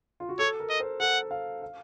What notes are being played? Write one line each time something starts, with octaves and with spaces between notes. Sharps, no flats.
F4
F#4
A4 C#5
A#4
D#5
C5
A4 F#5
F5
F5